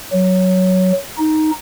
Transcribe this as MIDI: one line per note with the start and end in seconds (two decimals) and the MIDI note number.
0.12 0.92 54
1.17 1.51 63